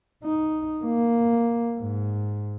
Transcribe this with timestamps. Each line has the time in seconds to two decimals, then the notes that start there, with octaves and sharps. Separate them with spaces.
0.24 D#4
0.85 A#3
1.79 G#2